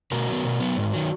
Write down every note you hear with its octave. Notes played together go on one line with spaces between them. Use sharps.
B2 F#4 A#4
F#3 B3
B2
F#3 B3
G#2
D#3 F#3